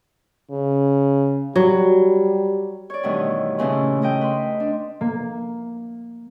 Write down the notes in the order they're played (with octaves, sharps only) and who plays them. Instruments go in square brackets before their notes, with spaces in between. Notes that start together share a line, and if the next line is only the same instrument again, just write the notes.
[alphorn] C#3
[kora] F#3 [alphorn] G3
[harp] C#5 D5
G2 B2 D#3 E3 A3
A#2 C#3 E3 A3 C#4
A3 D#5 G5
B4 C6
D4
A#3